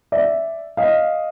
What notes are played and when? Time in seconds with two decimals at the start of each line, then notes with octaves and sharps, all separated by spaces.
0.12 D5 E5
0.77 D#5 F5